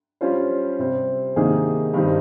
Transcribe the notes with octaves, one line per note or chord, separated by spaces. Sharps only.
G3 C#4 F4 C5
C3 G3 C4
C3 D#3 A#3 D#4 G#4
G2 D#3 G3 C4 D#4